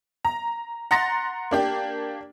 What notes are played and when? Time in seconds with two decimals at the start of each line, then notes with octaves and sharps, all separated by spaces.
0.25 A#5
0.91 F#5 A#5 C6 A6 A#6
1.51 A#3 D4 G4